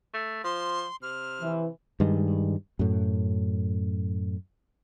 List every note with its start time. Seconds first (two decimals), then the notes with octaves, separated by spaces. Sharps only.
0.14 A3
0.44 F3 C6
1.02 C3 F6
1.42 E3
2.00 G2 D#3 G#3
2.79 F#2 A2